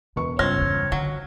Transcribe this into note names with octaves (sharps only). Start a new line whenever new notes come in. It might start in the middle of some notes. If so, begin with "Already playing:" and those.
E1 D2 B4 C#6
C#2 G2 C4 C#5 F6 A#6
E2 G2
D3 F#3